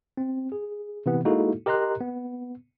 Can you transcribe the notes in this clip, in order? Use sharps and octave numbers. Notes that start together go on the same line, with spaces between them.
C4
G#4
C3 E3 B3
G#3 A#3 D#4 E4 F#4 A4
G4 A#4 D#5 A#5 C6 F#6
B3